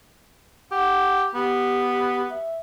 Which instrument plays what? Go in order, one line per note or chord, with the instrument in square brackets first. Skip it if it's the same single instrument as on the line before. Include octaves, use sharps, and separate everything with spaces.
[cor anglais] G4 [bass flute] F#5
[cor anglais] B3 [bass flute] G4
[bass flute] E5